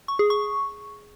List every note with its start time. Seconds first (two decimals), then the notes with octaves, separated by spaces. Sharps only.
0.08 C#6
0.19 G#4
0.30 C#6